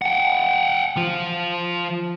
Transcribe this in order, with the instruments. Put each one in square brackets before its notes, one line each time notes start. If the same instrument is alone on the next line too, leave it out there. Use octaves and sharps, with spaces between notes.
[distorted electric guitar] F#5 G5
F3 F4